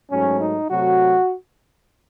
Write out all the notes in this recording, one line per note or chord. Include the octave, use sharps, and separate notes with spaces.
G#2 F#3 A3 C#4
D#4
C3 F#3 A3 F#4